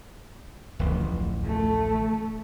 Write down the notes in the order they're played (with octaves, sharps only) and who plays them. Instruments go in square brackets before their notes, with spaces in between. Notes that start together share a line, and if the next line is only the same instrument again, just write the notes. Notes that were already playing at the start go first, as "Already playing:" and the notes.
[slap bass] D1 A1 F2
[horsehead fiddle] A3